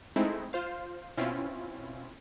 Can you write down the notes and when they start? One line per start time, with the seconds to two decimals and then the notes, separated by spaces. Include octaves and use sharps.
0.16 G#3 A3 C4 D#4 E4
0.53 F4 C5 F5
1.17 B2 C4 C#4 E4 F4